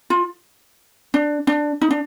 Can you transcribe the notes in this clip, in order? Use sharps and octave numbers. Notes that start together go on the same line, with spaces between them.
F4
D4
D4
D#4
D4